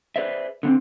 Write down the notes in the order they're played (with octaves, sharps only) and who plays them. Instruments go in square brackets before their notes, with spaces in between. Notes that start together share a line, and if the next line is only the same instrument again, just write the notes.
[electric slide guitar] G#4 B4 C5 D5 E5
D3 B3 C4